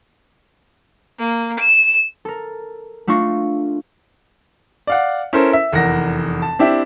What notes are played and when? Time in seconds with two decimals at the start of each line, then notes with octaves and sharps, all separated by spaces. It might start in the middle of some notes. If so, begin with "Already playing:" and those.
1.19 A#3
1.59 E7
2.25 A4 A#4
3.07 A3 D4 F4 C#6 A#6
4.87 D5 F5 F#5
5.33 C#4 E4 A4 A#4 C5
5.53 E5
5.72 F1 E2 A#4 F#5 A#6
6.42 A5
6.59 C4 D4 E4 G4 E5